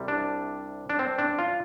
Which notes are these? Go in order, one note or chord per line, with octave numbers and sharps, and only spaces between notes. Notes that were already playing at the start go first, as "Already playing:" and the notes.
Already playing: C2 C3 G3
D4
D4
C4
D4
F4